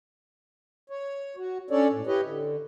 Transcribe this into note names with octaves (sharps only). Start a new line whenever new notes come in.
C#5
F#4
C#4 D4 A4 C#5 D5
A2
E4 G4 B4 C#5 D#5
D3